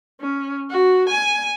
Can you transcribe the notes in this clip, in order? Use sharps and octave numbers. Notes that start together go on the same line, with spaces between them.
C#4
F#4
G#5